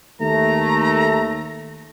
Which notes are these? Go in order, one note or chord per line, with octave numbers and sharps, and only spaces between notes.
D#2 A3 A#5